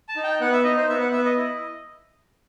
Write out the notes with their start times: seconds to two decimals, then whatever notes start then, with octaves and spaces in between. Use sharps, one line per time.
0.09 A5
0.16 D#4
0.24 G5
0.40 B3 F#5
0.52 E5
0.64 D#4 D#5
0.77 C5
0.89 B3 E5
1.00 F#5
1.12 B3 E5
1.25 D#5
1.37 E4